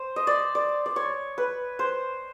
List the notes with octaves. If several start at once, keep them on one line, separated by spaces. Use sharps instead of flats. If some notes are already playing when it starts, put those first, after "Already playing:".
Already playing: C5
D#5
D5
D5
D5
C#5
B4
C5